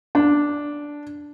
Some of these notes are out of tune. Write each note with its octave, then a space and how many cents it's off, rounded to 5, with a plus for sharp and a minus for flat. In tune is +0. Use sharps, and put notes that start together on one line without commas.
D4 -5